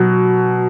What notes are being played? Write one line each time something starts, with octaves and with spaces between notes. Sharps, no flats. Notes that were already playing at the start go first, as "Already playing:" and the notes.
Already playing: B2 F#3